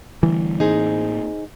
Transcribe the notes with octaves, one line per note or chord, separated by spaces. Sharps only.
D3 E3 G3 A3
A2 A#3 C4 D#4 G#4 C5